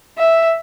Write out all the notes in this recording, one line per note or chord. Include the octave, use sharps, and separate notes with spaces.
E5